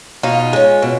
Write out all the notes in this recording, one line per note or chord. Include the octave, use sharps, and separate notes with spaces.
B2 D#4 F4
G#3 C#4
B2